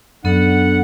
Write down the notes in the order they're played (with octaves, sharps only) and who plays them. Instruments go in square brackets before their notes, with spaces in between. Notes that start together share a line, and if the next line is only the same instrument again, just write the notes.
[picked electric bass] F#2 [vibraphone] B3 A4 [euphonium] D4 [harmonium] F#5